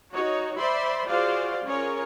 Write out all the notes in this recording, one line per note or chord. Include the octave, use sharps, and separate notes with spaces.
D#4 F#4 C#5
C5 D5 E5 B5 C6
F4 F#4 G#4 C5 D5 F5
C#4 F4 G#4 A#4 C#5